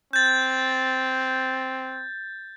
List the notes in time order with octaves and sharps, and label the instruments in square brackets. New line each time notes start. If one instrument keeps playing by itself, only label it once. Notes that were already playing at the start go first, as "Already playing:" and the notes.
[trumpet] C4 [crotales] G6 A6